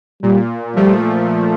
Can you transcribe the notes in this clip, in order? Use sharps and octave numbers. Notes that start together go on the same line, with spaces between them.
A#2 G3
F3 G3 A3